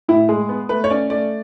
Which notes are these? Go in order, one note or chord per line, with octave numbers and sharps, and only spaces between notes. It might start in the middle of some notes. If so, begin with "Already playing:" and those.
A2 E4
G#3 G#4
B3
A3 B4
C#5
C#4 D5
A3 D5